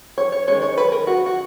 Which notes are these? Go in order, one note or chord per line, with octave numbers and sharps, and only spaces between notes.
C#5
C#5
D#3 G#3 C#4 C#5
C#5
B4
A#4
F#4
F#4